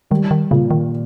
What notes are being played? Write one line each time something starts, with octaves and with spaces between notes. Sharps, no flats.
D#3 G3
D#3
A#2 C#3
D#3